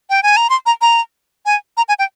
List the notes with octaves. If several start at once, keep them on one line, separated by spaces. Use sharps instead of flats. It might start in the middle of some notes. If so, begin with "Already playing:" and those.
G5
G#5
A#5
C6
A#5
A#5
G#5
A#5
G#5
G5